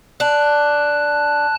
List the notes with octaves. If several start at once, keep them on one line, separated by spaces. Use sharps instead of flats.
D4 A5 F#6